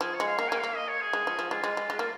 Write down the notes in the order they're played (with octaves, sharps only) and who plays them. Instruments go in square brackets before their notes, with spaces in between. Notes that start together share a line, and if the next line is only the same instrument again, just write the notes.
[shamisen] F3 [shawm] G#4
[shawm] C#5
[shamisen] G#3
[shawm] F5
[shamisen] A#3 [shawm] F5
[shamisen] A#3 [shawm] G#5
[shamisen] A#3 [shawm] F5
[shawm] D#5
C#5
G#4
[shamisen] G#3
F3
F3
[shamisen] G#3 [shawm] F4
[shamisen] G#3
G#3
G#3
A#3